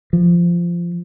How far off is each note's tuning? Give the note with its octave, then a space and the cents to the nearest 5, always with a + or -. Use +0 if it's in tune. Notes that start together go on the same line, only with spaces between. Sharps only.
F3 -15